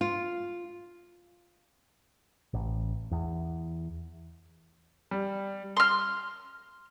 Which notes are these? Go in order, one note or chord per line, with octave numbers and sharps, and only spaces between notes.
F4
A1
E2
G3
C6 F6